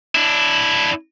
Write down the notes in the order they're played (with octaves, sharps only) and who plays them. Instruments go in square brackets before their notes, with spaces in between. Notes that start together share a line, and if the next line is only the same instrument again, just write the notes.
[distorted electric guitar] D4 E4